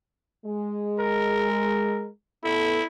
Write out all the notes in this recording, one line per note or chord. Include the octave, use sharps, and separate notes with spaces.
G#3
A#4
B3 E4 A4